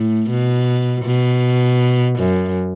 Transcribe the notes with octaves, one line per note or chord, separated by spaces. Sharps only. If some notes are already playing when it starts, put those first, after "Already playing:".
Already playing: A2
B2
B2
F#2